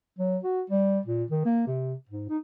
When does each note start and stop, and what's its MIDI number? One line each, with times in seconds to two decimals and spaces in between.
0.18 0.38 54
0.43 0.62 66
0.70 0.99 55
1.05 1.24 46
1.30 1.42 51
1.45 1.64 58
1.67 1.95 48
2.09 2.29 44
2.29 2.38 63